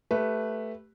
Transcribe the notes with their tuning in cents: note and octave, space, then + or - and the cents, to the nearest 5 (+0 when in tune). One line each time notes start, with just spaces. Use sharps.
A3 +0 G4 +0 B4 +0